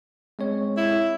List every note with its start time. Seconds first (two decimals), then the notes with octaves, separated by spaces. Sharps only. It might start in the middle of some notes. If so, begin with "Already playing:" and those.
0.39 G#3 C4 C#5
0.77 E4